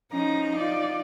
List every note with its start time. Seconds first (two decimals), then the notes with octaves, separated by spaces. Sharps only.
0.12 F3 C#4 D#4 A#5
0.57 F4 D5